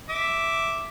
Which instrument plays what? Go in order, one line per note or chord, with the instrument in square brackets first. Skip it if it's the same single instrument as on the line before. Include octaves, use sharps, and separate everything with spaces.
[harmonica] E5 D6